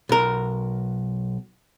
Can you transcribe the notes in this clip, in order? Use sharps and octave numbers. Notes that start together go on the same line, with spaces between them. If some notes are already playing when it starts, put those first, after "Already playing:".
B1 A#4